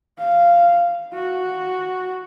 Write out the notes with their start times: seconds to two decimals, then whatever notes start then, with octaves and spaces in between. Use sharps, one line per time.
0.19 F5
1.13 F#4